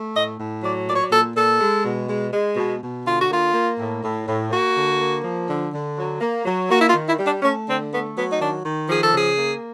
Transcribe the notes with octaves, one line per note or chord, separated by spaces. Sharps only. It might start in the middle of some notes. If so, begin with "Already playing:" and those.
Already playing: A3
A2 D#5
A2
F#3 D5
A#2 D5
C#5
D5
A#2 A4
A#2 A4
G#3
B2
G#3
G#3
B2
B2
D3 F4
F#4
A#3 F4
A#3
A2
A2
A2
A#3 F#4
D3
A#3
F3
D3
D3
F#3
A#3
F#3
A#3 F#4
E4
F4
D#3
E4
G3
D4
A3 C#4
D3 C4
A3 B3
F#3 B3
D#4
D#3 D4
D#3
F3 G#4
A4
C#3 G#4
A#3